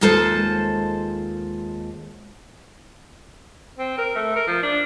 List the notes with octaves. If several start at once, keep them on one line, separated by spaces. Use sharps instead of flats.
D#2 G#3 F4 A4 C5 A5
C4
A#4
A3
A#4
F3
D4